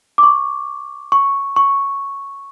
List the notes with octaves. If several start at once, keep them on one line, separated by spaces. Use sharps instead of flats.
D6
C#6
C#6
C#6